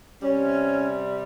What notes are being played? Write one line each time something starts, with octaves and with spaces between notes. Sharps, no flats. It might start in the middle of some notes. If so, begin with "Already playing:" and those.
C3 G3 C#4